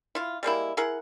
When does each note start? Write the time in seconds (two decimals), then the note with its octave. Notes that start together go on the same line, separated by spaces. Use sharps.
0.15 E4 F4
0.43 G3 G#3 A#3 E4
0.77 E4 G#4 A#4 F#5